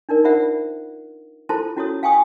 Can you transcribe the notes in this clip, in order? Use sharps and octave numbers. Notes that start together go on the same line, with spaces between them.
D4 D#4 A#4 D5
F4 A#4 C5 D5 E5 F#5
E4 F4 A4 C5 A5 C6
C#4 E4 F#4 A4 C#5 D#6
F5 G5 G#5 C#6 D#6